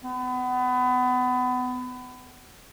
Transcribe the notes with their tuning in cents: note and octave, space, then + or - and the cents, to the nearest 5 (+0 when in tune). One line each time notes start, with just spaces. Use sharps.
B3 +25